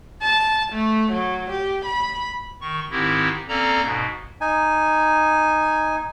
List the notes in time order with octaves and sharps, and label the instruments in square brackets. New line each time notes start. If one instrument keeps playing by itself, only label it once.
[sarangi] A5
A3
F#3
G4
B5
[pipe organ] D#3 C#6
G#2 D#3 C4 E4 G4
A#3 C4 C#4 A4 D5 A#5
G#2 B2
[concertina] D#4 G#5